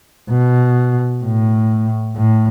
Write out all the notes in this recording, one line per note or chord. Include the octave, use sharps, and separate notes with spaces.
B2
A2
A2